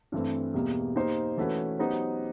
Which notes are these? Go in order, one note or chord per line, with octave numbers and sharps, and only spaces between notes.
G2 E3 A3 C4
E2 B2 G3 A#3
A#3 D#4 G4 C5 D#5
E3 A3 C#4 F#4 B4
F#3 B3 D#4 G4 C5